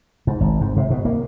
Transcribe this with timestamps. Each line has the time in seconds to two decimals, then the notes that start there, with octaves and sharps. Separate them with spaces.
0.27 G#2
0.41 G#1
0.61 G#2
0.77 C3
0.90 B2
1.05 A#3